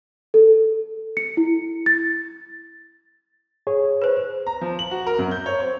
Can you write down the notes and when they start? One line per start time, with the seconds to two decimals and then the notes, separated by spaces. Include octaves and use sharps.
0.34 A4
1.17 C#7
1.37 E4
1.86 A6
3.67 G#4 C#5
4.02 B4 C5
4.47 A#5
4.61 F3
4.79 F#7
4.91 F#4
5.07 A#4
5.19 F#2
5.31 G6
5.46 C#5
5.60 C4